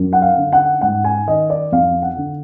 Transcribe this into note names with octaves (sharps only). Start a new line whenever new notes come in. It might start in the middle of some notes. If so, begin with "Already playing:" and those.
Already playing: F#2
F#5
F5
D3
F#5
G#2 F#5
G#5
D#3 D#5
D5
F2 F5
F#5
D3